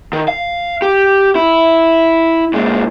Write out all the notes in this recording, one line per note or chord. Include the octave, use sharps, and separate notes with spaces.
D#3
F5
G4
E4
A#2 G#3